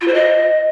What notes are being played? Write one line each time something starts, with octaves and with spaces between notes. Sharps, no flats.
F4
C5
D#5